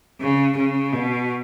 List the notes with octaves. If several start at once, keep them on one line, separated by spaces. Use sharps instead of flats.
C#3
C#3
B2